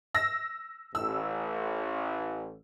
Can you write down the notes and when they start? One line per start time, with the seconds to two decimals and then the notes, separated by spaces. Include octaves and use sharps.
0.15 E6 A#6
0.95 A1 E6